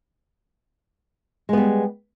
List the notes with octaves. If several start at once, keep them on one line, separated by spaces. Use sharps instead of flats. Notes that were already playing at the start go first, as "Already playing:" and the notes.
G3 G#3 B3